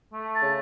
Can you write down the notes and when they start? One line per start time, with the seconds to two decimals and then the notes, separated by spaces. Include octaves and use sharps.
0.13 A3
0.34 A5
0.41 C#3